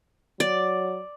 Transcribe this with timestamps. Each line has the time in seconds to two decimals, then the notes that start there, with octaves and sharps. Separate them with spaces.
0.40 F#3 D5